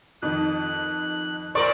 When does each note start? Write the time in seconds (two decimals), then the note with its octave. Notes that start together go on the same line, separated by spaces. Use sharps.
0.22 F2 D#3 F#6
1.55 A#2 A#4 C5 D5 C#6